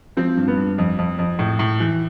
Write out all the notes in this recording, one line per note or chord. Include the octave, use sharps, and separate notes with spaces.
F3 C4
G2
B3
G2
F2
F2
F2
A2
A2
E3